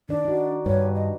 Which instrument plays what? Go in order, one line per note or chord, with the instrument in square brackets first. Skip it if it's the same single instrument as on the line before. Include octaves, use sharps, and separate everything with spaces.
[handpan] D#3 D5 [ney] D4
[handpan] D#4 F#4
[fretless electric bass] G2 [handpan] B4 [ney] C#5
[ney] D#5